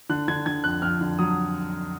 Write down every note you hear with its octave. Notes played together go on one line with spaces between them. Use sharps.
D3 F#6
D3 G#6
D3 G#6
F2 F#6
F2 F6
D3
F#3 D#6